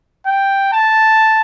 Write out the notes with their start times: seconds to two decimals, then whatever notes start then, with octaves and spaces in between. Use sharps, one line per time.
0.26 G5
0.73 A5